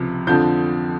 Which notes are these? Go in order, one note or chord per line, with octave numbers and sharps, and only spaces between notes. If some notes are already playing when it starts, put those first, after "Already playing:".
Already playing: C#2 C3 F3
F2 D3 F3 G6